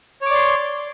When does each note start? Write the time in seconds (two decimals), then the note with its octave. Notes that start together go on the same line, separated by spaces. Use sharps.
0.21 C#5
0.26 D6
0.30 D5
0.35 C6